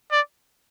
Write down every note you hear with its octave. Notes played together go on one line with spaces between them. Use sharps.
D5